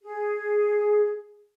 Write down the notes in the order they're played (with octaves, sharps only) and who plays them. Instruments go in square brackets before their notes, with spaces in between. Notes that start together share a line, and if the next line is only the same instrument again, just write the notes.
[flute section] G#4